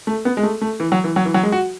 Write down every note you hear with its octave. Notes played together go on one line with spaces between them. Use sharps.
A3
B3
G#3
A3
A3
E3
F#3
E3
F#3
E3
F#3
G#3
F#4